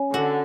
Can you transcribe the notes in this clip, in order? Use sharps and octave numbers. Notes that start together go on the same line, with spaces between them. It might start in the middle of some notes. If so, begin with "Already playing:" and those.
Already playing: C#4
D3 F#4